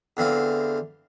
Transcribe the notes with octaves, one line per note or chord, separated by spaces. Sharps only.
E2 D3 C4 F5